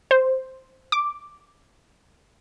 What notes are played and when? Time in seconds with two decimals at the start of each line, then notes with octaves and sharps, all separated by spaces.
0.11 C5
0.92 D6